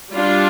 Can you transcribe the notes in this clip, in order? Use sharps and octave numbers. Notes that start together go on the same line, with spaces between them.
G3 D4 F4